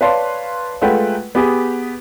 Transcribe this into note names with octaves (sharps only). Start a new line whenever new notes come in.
B4 C#5 D5 F5 A5 C6
G#3 A3 F4 B4 F#5 G5
B3 G4 G#4